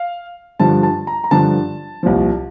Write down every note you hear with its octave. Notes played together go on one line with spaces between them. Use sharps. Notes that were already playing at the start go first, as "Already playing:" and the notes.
Already playing: F5
G2 D3 F3 A5
A5
A#5
A#5
G2 D3 F3 A5
C2 A#2 F3